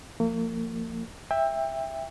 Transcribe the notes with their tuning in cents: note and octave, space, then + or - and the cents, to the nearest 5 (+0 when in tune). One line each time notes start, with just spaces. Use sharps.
F3 -20 A#3 -40
E5 +0 G5 +25